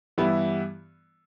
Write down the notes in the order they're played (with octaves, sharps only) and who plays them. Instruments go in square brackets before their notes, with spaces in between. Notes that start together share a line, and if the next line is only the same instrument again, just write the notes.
[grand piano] G2 E3 G3 B3 E4